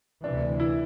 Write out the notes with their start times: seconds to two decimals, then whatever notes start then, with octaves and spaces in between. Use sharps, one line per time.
0.24 D2 C3 E3 D4
0.60 E4